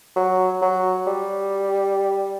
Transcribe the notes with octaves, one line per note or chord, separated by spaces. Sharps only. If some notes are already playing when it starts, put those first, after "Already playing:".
F#3
F#3
G3